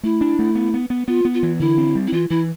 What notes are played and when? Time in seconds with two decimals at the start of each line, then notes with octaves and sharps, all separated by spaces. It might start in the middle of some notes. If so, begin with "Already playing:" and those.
0.03 A3 E4
0.21 D4
0.39 A3
0.55 B3
0.74 B3
0.90 B3
1.08 B3 F4
1.25 B3
1.34 F4
1.43 E3
1.60 D3 E4
1.78 C4
1.95 G3
2.07 E4
2.12 E3 F4
2.30 E3 E4